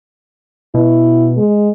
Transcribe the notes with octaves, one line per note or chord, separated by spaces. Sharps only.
B2 E4
G#3